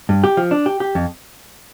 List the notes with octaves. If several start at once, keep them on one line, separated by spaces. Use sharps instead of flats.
G2
G4
F3
D4
G4
G4
F2